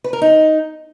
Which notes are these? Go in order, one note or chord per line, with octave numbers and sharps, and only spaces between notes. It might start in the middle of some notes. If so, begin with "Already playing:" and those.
B4
A#4
D#4